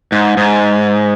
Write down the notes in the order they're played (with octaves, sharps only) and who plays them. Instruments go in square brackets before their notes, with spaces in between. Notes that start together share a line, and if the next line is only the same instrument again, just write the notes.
[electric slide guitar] G#2
G#2